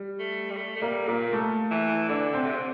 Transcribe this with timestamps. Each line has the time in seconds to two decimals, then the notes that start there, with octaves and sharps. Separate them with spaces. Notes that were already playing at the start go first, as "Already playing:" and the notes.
Already playing: G3
0.19 A3
0.50 G3
0.57 A3
0.76 A3
0.81 G3 A#3
1.08 A#2 A#3
1.32 A3
1.71 E3
2.09 D3 D4
2.33 C4
2.46 C3
2.56 D3